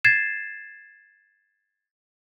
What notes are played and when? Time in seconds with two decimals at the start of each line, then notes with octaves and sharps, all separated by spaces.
0.04 G#6 A6 C7 E7